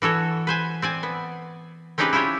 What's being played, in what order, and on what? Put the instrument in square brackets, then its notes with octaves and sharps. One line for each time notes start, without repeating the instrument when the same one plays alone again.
[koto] E3 F#4 A4 C#5
B4 C5 G#5
C4 D5 G#5
B3
C4 C#4 D#4 G4 G#4 B4
E4 F4 G4 C#5